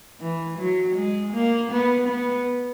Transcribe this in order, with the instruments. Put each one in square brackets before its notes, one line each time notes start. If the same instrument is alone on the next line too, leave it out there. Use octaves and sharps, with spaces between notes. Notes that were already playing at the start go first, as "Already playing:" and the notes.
[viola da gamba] E3
F#3
G#3
A#3
B3
B3